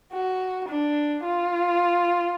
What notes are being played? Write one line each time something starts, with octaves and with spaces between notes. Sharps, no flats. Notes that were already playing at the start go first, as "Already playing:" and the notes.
F#4
D4
F4